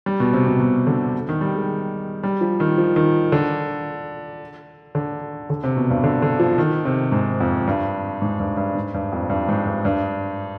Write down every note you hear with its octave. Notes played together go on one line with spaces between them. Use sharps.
G3
B2
C3
B2
B2
D3
D#3
G3
G#3
G3
F3
D#3
F3
D#3
D3
D3
D3
C3
B2
G2
D3
D3
F3
D#3
C3
G#2
F2
G2
G#2
G2
G2
G#2
G2
F2
G2
G#2
G2
G2